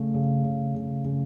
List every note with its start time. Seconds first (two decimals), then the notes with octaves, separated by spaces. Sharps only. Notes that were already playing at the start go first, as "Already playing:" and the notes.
Already playing: C#3 A3
0.14 C#3
0.44 C#3
0.74 C#3
1.05 C#3